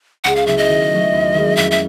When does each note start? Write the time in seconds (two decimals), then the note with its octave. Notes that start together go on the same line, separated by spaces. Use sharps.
0.24 C#2 F#5
0.36 F5
0.46 C#3 F#3 B3 E4 E5
0.57 D#5
0.69 D#3
0.91 F#3 A3
1.13 D#2
1.34 D#3 G#3 C#4 E4
1.57 F2 E5
1.71 E5